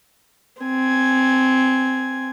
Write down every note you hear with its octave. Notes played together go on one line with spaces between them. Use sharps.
C4 G#5